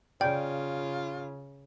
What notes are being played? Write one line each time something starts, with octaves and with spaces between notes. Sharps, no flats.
C#3 F4 D5 G5